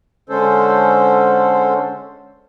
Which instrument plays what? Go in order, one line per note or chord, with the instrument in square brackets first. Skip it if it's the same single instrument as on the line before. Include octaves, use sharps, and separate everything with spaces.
[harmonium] D3 G#3 C#4 A4 C5